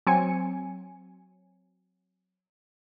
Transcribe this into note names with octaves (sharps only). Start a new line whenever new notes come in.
F#3 C4 G#5 C#7